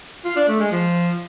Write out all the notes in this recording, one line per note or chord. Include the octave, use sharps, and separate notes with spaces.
F4
D4
A3
G#3
F3